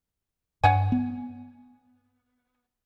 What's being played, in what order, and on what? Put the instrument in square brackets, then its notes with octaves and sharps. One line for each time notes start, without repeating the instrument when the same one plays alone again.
[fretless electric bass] G2 [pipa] C#5 F#5 G#5
[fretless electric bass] B3